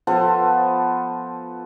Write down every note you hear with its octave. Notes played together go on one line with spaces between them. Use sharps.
F3 B3 A4 C5